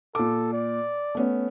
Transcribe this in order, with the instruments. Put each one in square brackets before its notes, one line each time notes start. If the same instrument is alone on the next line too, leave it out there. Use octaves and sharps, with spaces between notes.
[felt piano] A#2 D6 [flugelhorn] A4
[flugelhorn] D5
[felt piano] A3 B3 C#4